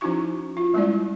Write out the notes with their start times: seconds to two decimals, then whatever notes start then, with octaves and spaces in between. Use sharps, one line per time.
0.01 F3 C#4 D#4 E4 F#4 C#6
0.57 F4
0.74 G3 G#3 A#3 C#4 E4 D5